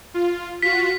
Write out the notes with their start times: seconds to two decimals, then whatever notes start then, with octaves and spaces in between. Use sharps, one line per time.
0.14 F4
0.63 F4 F#4 B6